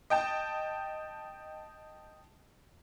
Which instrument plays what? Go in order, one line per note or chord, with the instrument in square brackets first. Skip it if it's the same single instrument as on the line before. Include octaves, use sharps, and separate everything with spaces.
[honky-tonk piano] D#5 G5 A5